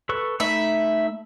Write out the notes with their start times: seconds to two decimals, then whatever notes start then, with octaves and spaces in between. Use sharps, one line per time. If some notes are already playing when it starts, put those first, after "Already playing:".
0.09 A4 B4 C#6
0.40 A3 D#4 E5 B5